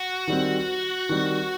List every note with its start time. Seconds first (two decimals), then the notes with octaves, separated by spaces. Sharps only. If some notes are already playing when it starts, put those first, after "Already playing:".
Already playing: F#4
0.27 D#3 G3 C4
1.09 D#3 G3 C4